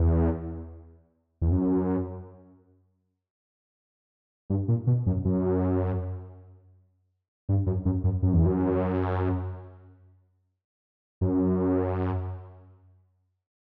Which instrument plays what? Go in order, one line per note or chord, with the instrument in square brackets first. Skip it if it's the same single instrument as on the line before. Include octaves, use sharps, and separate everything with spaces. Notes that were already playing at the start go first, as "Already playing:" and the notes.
Already playing: [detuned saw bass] E2
E2
F#2
G2
A#2
B2
F#2
F#2
G2
F#2
F#2
F#2
F#2
E2
F#2
F#2